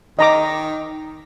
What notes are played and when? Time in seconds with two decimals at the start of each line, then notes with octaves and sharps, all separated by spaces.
0.19 D#3 D#5 A#5 D6